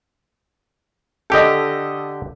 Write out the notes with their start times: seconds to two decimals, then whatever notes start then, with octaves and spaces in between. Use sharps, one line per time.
1.30 D3 G4 A4 D#5 G5